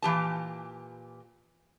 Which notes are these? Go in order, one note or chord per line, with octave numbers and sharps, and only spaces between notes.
A#2 E3 G4 A5